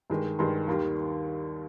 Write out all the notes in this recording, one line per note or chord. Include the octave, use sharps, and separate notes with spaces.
G2 D#3 G#3
G2 D#3 G#3 C6
D#2 D#3 G3